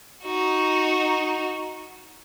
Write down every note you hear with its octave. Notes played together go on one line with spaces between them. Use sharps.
D#4 F#4